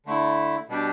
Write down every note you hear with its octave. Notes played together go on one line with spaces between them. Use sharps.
D3 A3 E4
B2 G3 D4 G4